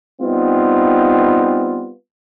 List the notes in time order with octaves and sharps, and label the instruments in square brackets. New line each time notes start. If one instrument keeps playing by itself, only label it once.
[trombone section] G3 B3 C4 D#4 F4